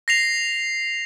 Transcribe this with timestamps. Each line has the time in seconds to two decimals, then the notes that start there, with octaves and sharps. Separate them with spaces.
0.08 A#6 C7 F7